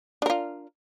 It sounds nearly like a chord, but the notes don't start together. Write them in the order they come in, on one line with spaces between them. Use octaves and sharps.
D4 A#4 F4